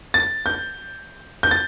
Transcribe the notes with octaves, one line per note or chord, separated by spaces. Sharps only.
A6
G6
G6
A6